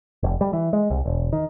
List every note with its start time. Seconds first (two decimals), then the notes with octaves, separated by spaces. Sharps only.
0.23 F1
0.41 G3
0.53 E3
0.73 G#3
0.90 C2
1.06 E1
1.33 D#3